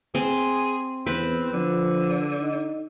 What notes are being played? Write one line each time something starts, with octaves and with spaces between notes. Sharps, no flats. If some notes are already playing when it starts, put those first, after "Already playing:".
C4 G#4
E2 C4 B4
D3 F3
D#4